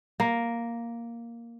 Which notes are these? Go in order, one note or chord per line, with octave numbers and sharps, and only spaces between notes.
A#3